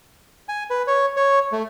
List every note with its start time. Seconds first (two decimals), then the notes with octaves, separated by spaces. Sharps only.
0.49 G#5
0.70 B4
0.87 C#5
1.17 C#5
1.52 A3